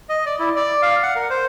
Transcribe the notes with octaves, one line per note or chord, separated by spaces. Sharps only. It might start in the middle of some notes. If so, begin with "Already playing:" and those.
D#5
D5
E4
D5
F5
F#5
A#4
C5